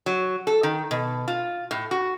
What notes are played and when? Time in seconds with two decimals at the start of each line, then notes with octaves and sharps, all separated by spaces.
0.06 F#3
0.47 A4
0.63 D#3
0.91 B2
1.28 F4
1.71 A2
1.91 F#4